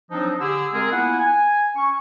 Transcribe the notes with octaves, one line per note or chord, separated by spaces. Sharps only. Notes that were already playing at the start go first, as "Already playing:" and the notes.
F3 F#3 C4 D4 D#4
D3 G4 G#4 E6
G#3 C4 G#4 A#4
A#3 B3 E4 F4 F#5 G#5
G#5
C#4 C#6